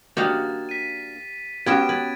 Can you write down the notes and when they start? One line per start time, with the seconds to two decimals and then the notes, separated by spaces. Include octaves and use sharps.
0.17 A#3 D4 F#4 G4 D#5 F5 A6
0.69 B6 D#7
1.66 B3 C#4 F#4 G4 G#6 D7 E7
1.89 B4 G#6 A6